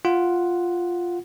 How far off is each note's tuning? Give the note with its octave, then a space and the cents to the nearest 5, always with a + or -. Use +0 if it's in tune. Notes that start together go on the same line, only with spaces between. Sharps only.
F4 +0 F#5 +0